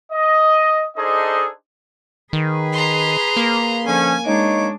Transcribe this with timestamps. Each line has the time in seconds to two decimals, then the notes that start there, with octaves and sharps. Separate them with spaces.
0.12 D#5
0.97 D4 D#4 G#4 A4 C5 D#5
2.33 D#3 G#4 B4
2.73 A#5 C6
3.36 A#3
3.86 D3 F3 C#4 G#5
4.26 G#3 D4 D#4 C#5 D6